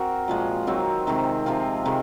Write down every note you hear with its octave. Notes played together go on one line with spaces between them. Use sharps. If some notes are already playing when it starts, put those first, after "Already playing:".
Already playing: C4 F#4 A#4
A#2 F3 G#3
D#3 F#3 C4 D#4
C3 D#3 G#3 C4
C3 F3 C4 F4
C3 D#3 G#3 D#4